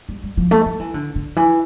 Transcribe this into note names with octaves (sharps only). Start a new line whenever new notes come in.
G3
G3
F3
A3
F3
E3
D3
D3
E3